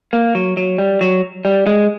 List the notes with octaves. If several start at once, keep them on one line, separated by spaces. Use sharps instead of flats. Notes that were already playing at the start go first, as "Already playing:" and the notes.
A#3
F#3
F#3
G3
F#3
G3
G#3